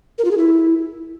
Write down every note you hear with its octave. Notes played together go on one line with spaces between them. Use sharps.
A#4
F4
G#4
E4